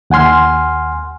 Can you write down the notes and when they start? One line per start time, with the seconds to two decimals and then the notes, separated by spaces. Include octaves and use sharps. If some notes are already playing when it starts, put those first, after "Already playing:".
0.10 D#2 F#5 G#5 C6 F6